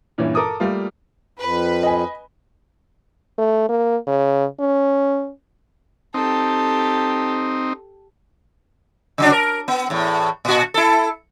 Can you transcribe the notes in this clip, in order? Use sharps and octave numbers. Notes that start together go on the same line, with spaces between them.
G2 A#2 E3 C#4 E4
A4 A#4 D6 D#6
G3 A3 A#3 F4
F2 B4
D#5 G#5
A3
A#3
C#3
C#4
C4 D#4 G4 A4
C#3 F#3 D4
A#4
B3
E2 A2
A#2 F#4
E4 A4